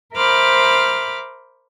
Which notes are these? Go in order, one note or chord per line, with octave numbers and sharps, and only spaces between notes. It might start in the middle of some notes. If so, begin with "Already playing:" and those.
A#4 C5 E5 B5 D6 F6